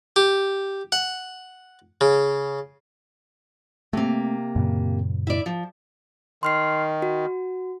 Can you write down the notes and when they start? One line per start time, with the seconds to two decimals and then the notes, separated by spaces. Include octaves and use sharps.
0.16 G4
0.92 F#5
2.01 C#3
3.93 C3 A3 A#3 C4
4.56 F#2 A#2 C#3
5.27 E4 D5
5.46 F3
6.43 D#3 C6 F6 C7
7.02 F#4